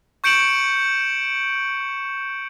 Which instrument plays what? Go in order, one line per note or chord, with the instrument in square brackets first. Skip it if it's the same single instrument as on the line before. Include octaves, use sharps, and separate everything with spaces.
[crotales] C#6 G6 C#7 D7 E7 F#7